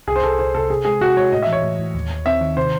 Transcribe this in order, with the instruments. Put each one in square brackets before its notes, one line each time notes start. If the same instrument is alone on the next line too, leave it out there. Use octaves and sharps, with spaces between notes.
[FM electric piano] C2 [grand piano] G#4
[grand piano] C5
[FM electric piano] C2 [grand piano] A4
[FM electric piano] C2 [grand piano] C5
[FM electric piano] C3 [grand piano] A4
[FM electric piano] C3 [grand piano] G#4
[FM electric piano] G#3 [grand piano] G#4
[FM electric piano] C3 [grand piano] F#4
[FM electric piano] G#3 [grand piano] C#5
[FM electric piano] A2 [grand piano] D#5
[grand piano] E5
[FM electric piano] E3
[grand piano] C#5
[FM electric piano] A2
A2
D#2
D#2
[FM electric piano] C4 [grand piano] E5
[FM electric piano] D#3
[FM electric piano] C3 [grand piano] C5